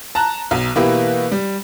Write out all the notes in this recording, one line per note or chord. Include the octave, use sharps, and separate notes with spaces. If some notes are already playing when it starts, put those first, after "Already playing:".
A5 A#5 F#6
B1
B2 E3 A#3 E4 G4 B4
G3